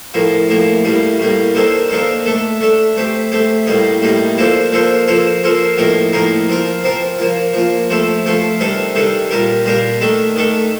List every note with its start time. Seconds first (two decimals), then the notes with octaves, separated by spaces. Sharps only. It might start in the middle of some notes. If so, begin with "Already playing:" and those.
0.14 A2 F3 A#3
0.49 A2 F3 A#3
0.84 A2 G3 A#3
1.19 A2 G3 A#3
1.54 D#3 A#3 D4 A4 C5
1.90 D#3 A#3 D4 A4 C5
2.26 A3 D4 A4
2.60 A3 D4 A4
2.97 A3 C4 G4
3.32 A3 C4 G4
3.66 A2 G3 A#3 D#4
4.02 A2 G3 A#3 D#4
4.37 F3 A#3 D4 A4 C5
4.72 F3 A#3 D4 A4 C5
5.08 F3 A#3 F4 A4 C5
5.43 F3 A#3 F4 A4 C5
5.78 A2 F3 A#3 D#4 A#4
6.13 A2 F3 A#3 D#4 A#4
6.49 F3 C4 F4 A#4
6.84 F3 C4 F4 A#4
7.18 F3 A#3 F4
7.54 F3 A#3 F4
7.90 F3 A3 C4 F4 A4
8.25 F3 A3 C4 F4 A4
8.60 C3 D#3 G3 D4 A4
8.95 C3 D#3 G3 D4 A4
9.31 A#2 G3 D4 G4 A#4
9.65 A#2 G3 D4 G4 A#4
10.01 D#3 A3 D4 A4
10.36 D#3 A3 D4 A4